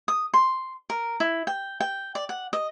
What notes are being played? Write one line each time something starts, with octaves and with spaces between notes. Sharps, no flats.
D#6
C6
A#4
E4
G5
G5
D5
F#5
D#5